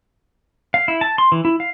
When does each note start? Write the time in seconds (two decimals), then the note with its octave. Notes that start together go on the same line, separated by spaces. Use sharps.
0.74 F5
0.88 E4
1.01 A5
1.18 C6
1.32 E3
1.45 E4
1.60 F5